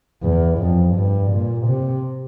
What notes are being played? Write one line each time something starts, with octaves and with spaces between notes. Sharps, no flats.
E2
F2
G2
A#2
C3